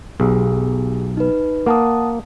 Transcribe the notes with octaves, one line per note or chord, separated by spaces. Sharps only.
B1 G4 G#4
D#4 B4
A#3 F#5 A5 D#6